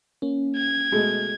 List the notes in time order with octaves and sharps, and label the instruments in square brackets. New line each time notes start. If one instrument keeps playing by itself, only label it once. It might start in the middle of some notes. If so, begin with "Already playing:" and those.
[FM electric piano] A#3 C#4
[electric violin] G#6
[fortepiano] B2 G#3 A3